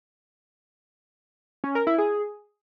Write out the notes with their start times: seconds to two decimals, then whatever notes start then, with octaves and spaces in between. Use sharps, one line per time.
1.64 C#4
1.75 A#4
1.87 E4
1.98 G#4